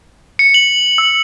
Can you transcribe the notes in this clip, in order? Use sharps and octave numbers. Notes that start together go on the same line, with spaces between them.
C#7
F#7
E6